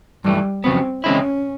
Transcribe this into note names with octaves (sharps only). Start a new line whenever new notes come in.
G2 E3 G3 A3
F2 C#3 F#3 B3 C4
C#3 E3 G#3 C4 C#4 E4